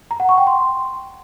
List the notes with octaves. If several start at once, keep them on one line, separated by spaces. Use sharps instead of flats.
A#5
F#5
C#6
G5
C6